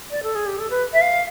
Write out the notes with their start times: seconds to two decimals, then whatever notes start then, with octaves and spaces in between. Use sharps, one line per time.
0.11 D5
0.23 A4
0.35 G#4
0.47 G4
0.59 A4
0.70 B4
0.93 E5
1.01 F5